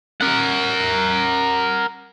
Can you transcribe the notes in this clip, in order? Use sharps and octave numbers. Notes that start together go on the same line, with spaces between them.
A#4 F#5